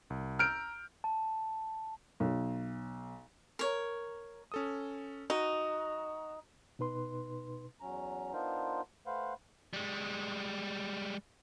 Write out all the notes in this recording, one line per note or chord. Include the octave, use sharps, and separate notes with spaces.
C2
A#5 E6 F6 G6 D7
A5
B1
A#4 C#5
C#4 A4 D#6
D#4 F#4
B2 D#4 B4 C6
E2 F#3 C#4 A#5
B3 D4 D#4 F4 A#4 C5
A3 B4 C5 F5 F#5
G3 G#3